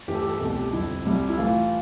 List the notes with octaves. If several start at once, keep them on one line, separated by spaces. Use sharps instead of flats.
G2 E3 A3 G4
A4
G4
A4
G4
C2 B2 A3 A4
G4
F2 D3 G3 E4
C2 C3 G3
E4
A2 E3 A3 F4